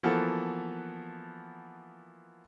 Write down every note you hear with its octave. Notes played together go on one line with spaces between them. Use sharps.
E3 F3 A#3 B3 F#4 A4